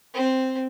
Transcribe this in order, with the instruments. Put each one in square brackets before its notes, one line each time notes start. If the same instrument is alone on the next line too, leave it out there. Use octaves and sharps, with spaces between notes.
[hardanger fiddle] C4